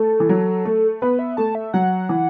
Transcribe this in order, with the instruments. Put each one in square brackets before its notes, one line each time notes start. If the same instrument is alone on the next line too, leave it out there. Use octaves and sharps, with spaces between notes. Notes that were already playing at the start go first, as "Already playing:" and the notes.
Already playing: [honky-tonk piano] A3 [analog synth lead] A4
[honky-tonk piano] E3
F#3
A3
[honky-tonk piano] B3 [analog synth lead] B4
[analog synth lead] E5
[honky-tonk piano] A3 [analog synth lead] A5
[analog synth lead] E5
[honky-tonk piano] F#3 [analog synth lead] F#5
[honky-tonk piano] E3